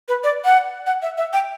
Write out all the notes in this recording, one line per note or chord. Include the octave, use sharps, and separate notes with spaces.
B4
D5
F#5
F#5
E5
E5
G5